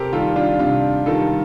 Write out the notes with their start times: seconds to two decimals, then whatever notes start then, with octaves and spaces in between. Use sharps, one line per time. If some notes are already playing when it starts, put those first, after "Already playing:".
Already playing: C3 G4 A4 A#4 C5
0.13 D#3 G3 F4 A4
0.36 D4 F4
0.59 C3 D4 F4
1.06 D#3 G3 F4 A4